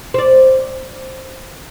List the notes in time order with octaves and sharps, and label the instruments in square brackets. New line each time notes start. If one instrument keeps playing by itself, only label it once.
[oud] C5 D5